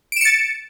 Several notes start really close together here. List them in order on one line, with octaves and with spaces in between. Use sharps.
D7 E7 C#7 A6